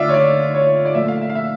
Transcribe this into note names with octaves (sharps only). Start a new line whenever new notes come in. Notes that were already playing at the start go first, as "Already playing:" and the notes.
Already playing: D3 A3 F4 D5 E5
C#5
D5
C#5
D5
A#2 F3 A3 E5
F5
E5
F5
E5